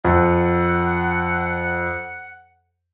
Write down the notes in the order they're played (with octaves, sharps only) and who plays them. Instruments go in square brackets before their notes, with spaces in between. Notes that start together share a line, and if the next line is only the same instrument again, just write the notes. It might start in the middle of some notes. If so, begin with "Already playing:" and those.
[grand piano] F2 [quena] F#5